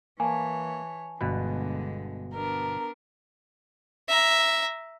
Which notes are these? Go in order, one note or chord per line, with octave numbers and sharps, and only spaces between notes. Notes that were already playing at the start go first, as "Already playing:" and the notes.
E3 A#3 C#5 G#5 A5
G1 B2 D3 G#3 B4
B3 D4 A#4
E5 A#5